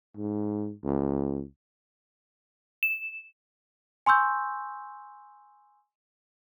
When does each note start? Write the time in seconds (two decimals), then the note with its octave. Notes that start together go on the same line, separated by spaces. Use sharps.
0.17 G#2
0.84 C#2
2.83 E7
4.06 G#5 C6 C#6 E6 G6